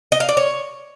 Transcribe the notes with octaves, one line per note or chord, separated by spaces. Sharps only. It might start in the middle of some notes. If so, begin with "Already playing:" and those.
D#5
F5
D5
C#5